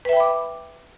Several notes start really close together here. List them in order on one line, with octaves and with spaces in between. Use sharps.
B4 E5 G5 B5 D6